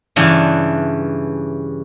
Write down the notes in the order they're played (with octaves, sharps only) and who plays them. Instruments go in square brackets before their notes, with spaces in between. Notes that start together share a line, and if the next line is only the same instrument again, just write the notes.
[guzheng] G2 C#3 E3 D4